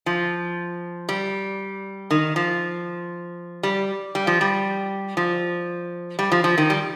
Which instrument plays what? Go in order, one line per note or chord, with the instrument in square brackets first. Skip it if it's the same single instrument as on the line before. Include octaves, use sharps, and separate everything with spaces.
[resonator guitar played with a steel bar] F3
G3
D#3
F3
G3
G3
F3
G3
F3
G3
F3
F3
D#3
G3